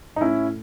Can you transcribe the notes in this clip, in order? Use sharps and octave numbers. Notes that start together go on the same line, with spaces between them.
D#4
A2 C#4 E4